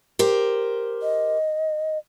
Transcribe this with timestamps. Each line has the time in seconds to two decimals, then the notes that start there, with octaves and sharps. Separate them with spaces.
0.19 G4 A#4 C5
1.02 D#5